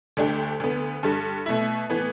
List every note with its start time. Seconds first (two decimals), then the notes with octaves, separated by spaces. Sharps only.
0.17 D2 D3 A3 D4 G4
0.60 D2 D3 B3
1.03 G2 D3 G3
1.46 B2 A3 E4
1.90 A2 E3 B3